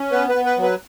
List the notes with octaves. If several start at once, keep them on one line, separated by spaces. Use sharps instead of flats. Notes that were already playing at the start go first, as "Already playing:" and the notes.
Already playing: C#4
B3 B4
B4
B3
B4
F#3
B4